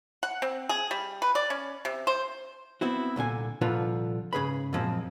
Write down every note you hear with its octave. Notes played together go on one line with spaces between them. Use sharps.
F#5
C4
G#4
G3
B4
D5
C#4
C3
C5
B3 C4 E4 F#4
C2 A#2 D3 G#5
C2 A#2 D3 F3 F4 B4
G#2 C#3 G#4 B4 B5
F#2 A#2 F3 G#3 C4